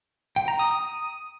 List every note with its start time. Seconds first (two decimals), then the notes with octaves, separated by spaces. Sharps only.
0.36 G5
0.48 A#5
0.59 D#6
0.71 D#6